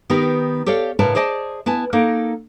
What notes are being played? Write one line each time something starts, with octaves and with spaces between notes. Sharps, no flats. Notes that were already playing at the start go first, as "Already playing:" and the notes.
D#3 B3 D#4 G4 A#4
G4 A4 C#5 D5 F5
A2 C#3 A#4 B4 A5
G#4 C5 D5 D#5 G#5 A5
B3 E4 G#5 A5
A#3 D#4 A4 A#4